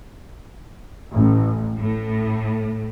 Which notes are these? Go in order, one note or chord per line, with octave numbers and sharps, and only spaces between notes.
A1
A2